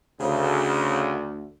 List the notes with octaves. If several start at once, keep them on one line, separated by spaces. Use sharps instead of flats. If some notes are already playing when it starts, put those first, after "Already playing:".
D2 C#3